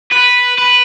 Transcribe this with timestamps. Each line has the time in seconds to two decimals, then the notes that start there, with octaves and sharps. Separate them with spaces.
0.12 B4
0.58 B4